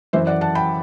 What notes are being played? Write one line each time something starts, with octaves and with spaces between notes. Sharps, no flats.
F#2 E3 C5 E5
D5 F#5
F#5 A5
G5 B5